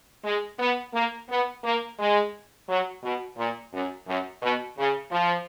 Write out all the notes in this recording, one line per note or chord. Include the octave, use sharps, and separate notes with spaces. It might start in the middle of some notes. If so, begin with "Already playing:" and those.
G#3
B3
A#3
B3
A#3
G#3
F#3
B2
A#2
F#2
F#2
B2
C#3
F3